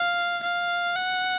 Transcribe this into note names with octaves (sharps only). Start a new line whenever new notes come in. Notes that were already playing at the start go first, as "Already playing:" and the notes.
Already playing: F5
F5
F#5